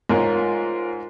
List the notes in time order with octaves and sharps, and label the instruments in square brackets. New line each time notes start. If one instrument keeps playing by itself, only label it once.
[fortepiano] G#2 [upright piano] F4 A#4 C#5